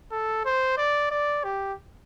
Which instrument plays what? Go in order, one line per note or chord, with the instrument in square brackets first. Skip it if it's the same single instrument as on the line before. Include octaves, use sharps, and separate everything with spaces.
[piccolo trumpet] A4
C5
D5
D5
G4